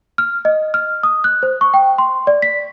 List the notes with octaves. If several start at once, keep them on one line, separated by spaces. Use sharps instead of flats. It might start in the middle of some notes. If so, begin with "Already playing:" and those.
F6
D#5
F6
D#6
F#6
C5
C#6
G5
C6
D5
B6